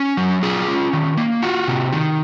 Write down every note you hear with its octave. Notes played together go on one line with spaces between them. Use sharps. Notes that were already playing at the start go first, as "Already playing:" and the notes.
Already playing: C#4
F#3
F4 G#4
C#4
D#3
A#3
F4 F#4
C3
D#3